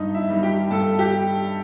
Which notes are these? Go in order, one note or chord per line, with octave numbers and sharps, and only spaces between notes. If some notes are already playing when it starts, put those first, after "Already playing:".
Already playing: G2 D#4 D#5
E4 E5
D#3 G3
G4 G5
G2 A4 A5
G4 G5